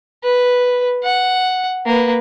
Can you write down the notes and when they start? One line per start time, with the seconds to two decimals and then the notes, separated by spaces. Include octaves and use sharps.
0.23 B4
1.03 F#5
1.86 A#3 B4